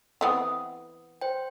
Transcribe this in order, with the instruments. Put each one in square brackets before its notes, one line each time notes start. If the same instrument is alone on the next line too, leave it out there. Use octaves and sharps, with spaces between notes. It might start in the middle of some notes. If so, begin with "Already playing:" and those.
[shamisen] E3 B3 C4 [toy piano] F#5 D#6
[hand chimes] C5 G5